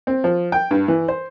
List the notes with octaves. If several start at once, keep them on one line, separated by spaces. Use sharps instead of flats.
C4
F3
G5
G2
E3
C5